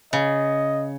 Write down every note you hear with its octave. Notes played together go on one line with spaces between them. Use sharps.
C#3 D#5